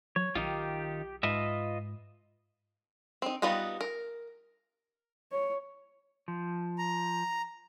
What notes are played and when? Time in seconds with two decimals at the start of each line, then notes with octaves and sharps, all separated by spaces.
0.16 F#3 C#5
0.35 B1 D#3 D#4 F4 G4
1.23 G#2 F4 B4 D#5 E5
3.22 C4 D#4
3.42 G3 B3 D#4 F4 F#4
3.81 A#4
5.32 C#5
6.28 F3
6.78 A#5